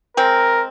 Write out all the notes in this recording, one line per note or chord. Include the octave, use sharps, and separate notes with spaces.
G#3 C4 A#4